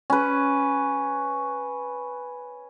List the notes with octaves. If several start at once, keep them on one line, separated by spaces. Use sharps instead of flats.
C#4 B4